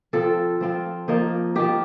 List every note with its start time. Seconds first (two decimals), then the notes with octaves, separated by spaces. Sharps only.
0.13 F3 C4 F4 A4
0.61 F3 C4 F4
1.08 F3 A#3 D#4
1.55 F3 A#3 D#4 G4